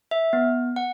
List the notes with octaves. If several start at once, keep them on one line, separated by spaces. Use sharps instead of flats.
E5
B3
F#5